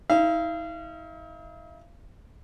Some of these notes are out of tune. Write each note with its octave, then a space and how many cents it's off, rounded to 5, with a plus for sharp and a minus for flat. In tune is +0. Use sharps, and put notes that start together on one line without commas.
D#4 +45 F5 -35